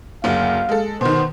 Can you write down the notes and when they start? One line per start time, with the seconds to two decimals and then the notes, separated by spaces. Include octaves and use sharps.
0.24 F#1 D2 F5
0.69 G#3 A4
1.01 B2 D#3 C5